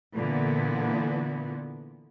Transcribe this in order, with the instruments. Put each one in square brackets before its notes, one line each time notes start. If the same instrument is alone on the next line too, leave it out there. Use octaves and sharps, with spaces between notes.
[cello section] A#2 D3 E3 B3